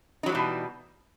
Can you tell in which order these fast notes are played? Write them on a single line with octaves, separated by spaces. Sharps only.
D#4 F#3 E3 G3 B2